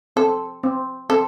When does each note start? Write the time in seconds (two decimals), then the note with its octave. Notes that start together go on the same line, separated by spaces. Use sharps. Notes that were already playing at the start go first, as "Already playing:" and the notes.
0.16 C4 A4
0.63 C4
1.10 C4 A4